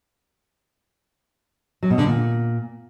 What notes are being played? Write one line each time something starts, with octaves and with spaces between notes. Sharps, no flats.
F#3
B2
D3
A#2